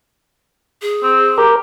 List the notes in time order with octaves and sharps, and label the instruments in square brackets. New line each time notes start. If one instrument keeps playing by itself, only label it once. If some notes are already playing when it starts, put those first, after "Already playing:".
[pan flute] G#4
[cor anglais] C4
[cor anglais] G4 [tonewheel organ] A#4